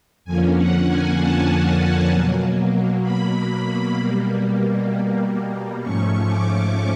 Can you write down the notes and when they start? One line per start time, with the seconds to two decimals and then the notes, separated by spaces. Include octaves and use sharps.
0.24 F2 D3 F3 A#3 C#4 G#5
0.56 F#5
0.86 G#5
1.17 A5
2.10 B2 F#3 A#3
3.02 B5
3.95 B2 G3 A#3
5.81 G#2 F3 A3 C#4 C#6
6.27 D6